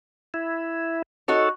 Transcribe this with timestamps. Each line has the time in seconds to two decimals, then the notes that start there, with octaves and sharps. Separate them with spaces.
0.34 E4
1.28 D#4 F#4 A4 C#5